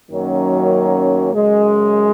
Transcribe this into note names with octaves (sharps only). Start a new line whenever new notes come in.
F#2 D#3 F#3 A#3 C#4
F#2 C#3 G#3